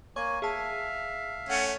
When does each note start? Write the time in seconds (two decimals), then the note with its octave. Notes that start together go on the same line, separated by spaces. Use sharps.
0.16 A#3 C#5 G#5 C#6
0.42 G#4 E5 F5 A5
1.49 A3 C#4 F#5